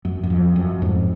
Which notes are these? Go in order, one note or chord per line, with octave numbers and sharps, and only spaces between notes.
F#2
F#2
F2
F#2
F2 G#2